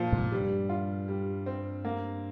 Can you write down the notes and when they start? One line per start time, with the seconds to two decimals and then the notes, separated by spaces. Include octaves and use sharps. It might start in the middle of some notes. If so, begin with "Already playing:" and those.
Already playing: A#2 F3
0.12 G#2 C3
0.32 G2 G3
0.69 F4
1.08 G3
1.46 C4
1.85 A#3